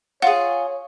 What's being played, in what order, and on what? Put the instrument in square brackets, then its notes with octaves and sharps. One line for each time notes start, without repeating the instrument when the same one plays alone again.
[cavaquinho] F4 G#4 [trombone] C#5 [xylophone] F#5